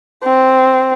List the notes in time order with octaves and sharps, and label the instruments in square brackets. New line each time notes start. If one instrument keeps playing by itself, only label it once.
[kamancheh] C4